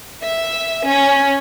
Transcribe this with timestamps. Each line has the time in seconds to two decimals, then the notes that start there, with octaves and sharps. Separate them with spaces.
0.24 E5
0.87 C#4